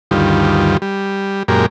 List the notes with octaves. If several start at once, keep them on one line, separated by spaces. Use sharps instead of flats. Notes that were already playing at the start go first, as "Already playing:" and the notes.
D2 G2 D#3 G3 F4
G3
F#2 A#2 G#3 G4 A#4